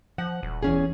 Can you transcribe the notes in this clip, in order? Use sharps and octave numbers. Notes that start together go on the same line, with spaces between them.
F3 F#5
D#1
E2 C#4 G#4